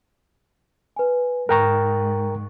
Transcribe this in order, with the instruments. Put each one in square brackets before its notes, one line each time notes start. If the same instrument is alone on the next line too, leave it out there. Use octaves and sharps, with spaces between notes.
[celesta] B4 G#5
[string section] G#2 [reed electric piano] A#4 G5 A#5 [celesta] C#6 F#6